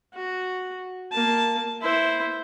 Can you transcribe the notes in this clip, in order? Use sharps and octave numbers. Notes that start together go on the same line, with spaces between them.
F#4
A#3 A5
E4 C5